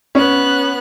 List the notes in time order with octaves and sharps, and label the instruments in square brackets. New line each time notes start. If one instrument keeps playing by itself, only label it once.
[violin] B3 F#6 [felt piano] C#4